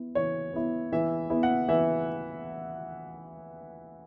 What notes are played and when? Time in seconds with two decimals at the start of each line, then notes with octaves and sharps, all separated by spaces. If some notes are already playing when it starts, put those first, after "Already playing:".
Already playing: B3 E4
0.15 E3 C#5
0.53 B3 E4
0.92 E3 E5
1.30 B3 E4
1.43 F#5
1.68 E3 E5